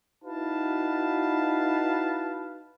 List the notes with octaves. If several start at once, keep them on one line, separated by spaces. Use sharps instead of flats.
D#4 E4 F#4 B4 F5 A5